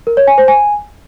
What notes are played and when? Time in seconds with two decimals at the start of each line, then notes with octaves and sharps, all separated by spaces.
0.07 A#4
0.17 C#5
0.27 G#5
0.38 C5
0.48 G#5